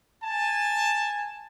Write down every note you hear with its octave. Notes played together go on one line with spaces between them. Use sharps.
G#5 A5